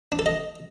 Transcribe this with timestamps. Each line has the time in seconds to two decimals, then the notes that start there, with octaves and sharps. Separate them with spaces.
0.12 D4
0.19 A4
0.26 D#5